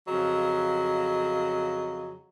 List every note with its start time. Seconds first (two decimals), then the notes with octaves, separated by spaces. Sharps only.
0.08 F2 C#3 F#3 D#5